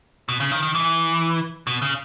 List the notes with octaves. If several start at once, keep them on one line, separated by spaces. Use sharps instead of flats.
B2
C#3
D#3
D#3
E3
B2
C#3